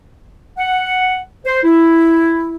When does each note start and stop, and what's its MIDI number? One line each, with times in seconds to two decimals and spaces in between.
0.58 1.20 78
1.45 1.60 72
1.63 2.55 64